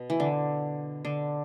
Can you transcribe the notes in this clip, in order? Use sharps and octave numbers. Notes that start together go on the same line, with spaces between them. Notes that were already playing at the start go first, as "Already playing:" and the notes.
Already playing: B2
E3
D3
D3